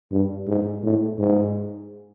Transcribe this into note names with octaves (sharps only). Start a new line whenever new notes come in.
G2
G#2
A2
G#2